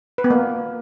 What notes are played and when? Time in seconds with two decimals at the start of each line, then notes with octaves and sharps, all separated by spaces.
0.18 B4
0.24 B3
0.30 A#3